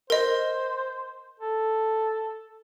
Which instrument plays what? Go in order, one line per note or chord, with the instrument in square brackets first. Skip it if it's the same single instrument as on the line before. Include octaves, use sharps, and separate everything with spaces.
[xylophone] A#4 D#5 [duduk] C5
[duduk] A4